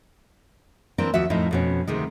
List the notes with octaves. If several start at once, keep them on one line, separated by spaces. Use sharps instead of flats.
E3 A#3 C4 D4 A#4
D#2 F3 F#4 E5
F2 A2 F3 D#4 E4
F2 B2 C#4
D2 C3 D#3 G#3